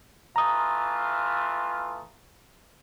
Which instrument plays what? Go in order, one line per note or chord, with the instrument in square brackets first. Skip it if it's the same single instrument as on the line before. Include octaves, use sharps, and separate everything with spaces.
[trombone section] E3 A3 F4 [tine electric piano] A#5 D#6